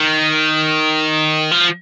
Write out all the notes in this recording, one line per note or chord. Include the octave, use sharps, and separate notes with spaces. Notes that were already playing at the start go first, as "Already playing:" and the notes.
Already playing: D#3
F3